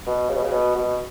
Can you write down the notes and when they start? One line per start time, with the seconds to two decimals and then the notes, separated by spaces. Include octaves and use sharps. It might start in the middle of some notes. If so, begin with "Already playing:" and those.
0.07 B2
0.29 C#3
0.36 B2
0.43 C#3
0.52 B2
0.75 B2